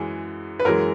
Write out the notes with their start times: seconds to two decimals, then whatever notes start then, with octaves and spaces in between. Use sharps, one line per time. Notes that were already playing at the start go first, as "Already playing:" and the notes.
Already playing: F#2 E3 G#3 G#4
0.59 B4
0.65 F#2 E3 G#3 A#4